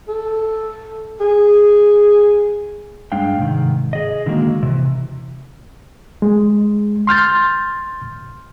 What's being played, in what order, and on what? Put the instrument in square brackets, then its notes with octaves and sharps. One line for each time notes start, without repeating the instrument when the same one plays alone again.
[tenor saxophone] A4
G#4
[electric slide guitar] G2 G#3 D4 F5 G5
G#2 C3 D#3
G#4 D#5
D3 D#3 G#3 A#3 F#4
C3 E3
[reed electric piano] G#3
C6 F6 G6 A6